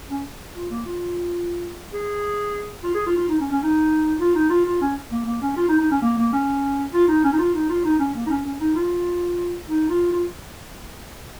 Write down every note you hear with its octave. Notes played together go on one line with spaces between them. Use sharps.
C#4
F4
A#3
F4
G#4
F4
G#4
F4
F4
D#4
C#4
C#4
D#4
F4
D#4
F4
F4
C#4
A#3
A#3
C#4
F4
D#4
D#4
C#4
A#3
A#3
C#4
F4
D#4
C#4
D#4
F4
D#4
F4
D#4
C#4
A#3
D#4
C#4
C#4
D#4
F4
D#4
F4
F4